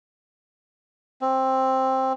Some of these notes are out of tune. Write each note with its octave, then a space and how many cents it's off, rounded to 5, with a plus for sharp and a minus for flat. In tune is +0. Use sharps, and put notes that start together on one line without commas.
C4 +10